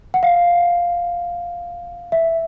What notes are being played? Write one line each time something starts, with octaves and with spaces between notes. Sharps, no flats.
F#5
F5
E5